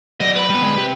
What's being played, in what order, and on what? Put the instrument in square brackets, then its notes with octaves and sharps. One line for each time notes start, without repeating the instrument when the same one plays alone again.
[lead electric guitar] F#3 D5 [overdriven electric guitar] D#5
[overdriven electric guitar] B4 B5
[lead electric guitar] G3 B3
D3 G#3
C3 G4